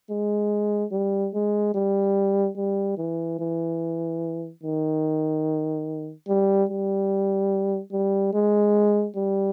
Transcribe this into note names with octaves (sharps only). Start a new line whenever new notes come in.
G#3
G3
G#3
G3
G3
E3
E3
D#3
G3
G3
G3
G#3
G3